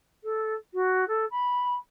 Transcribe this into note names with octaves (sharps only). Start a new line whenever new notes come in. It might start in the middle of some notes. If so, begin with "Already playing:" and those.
A4
F#4
A4
B5